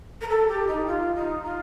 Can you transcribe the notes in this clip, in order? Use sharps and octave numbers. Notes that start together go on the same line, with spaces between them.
A#4
A4
G4
D#4
F4
D#4
F4